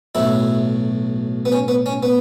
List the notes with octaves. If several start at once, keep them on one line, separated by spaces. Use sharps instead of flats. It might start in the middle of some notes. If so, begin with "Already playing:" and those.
B1 A2 F#3 E4
B3
C#4
B3
C#4
B3